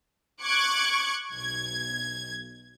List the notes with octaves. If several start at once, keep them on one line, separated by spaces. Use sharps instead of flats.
C#6 D6 F#6 G#6
B1 G#6